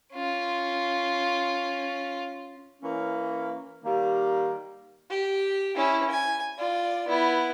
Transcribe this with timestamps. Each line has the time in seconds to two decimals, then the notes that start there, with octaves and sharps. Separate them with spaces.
0.14 C#4 F4
2.82 E3 A#3 C#4
3.85 D#3 G3 A#3
5.10 G4
5.75 C#4 E4
6.10 G#5
6.58 F4 D5
7.08 B3 E4